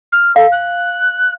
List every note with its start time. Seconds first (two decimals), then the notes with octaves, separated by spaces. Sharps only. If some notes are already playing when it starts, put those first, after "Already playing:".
0.12 F6
0.36 A4 F5
0.52 F#6